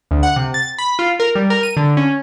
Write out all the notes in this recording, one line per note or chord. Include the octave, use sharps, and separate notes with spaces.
D2
F#5
C3
A6
B5
F4
A#4
G3
A#4
D#7
D3
C#4